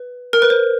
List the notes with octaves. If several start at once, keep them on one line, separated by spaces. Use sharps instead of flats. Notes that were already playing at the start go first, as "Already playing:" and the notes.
Already playing: B4
A#4
B4
C5